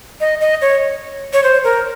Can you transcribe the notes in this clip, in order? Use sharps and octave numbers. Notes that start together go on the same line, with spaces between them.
D#5
D#5
C#5
C#5
C5
A#4